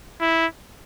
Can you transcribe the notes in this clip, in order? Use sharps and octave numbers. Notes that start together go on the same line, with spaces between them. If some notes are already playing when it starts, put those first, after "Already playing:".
E4